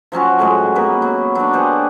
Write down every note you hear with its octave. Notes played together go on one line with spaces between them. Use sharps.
F3 F#3 C#4 F#4
A2 F#3 G#3
A#3 B3 B4
F#3
F#3 D4
G4 G#4 C5 F#5